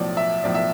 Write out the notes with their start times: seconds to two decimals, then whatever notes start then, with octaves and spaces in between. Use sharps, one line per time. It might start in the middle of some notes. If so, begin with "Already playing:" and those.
Already playing: B1 A2 F3 D5
0.17 E5
0.44 B1 A2 F3 D5
0.55 E5